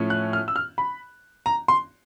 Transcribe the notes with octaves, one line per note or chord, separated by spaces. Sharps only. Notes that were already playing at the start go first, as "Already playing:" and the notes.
Already playing: A2 F3 A3 C#4
F#6
F6
E6
F6
B5
A#5
C6